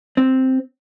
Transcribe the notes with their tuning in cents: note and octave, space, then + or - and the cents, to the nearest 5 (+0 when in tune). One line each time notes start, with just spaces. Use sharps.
C4 +0